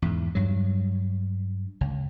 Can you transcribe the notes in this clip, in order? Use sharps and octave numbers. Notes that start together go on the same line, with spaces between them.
E2 G#2
G2 F#3
C#2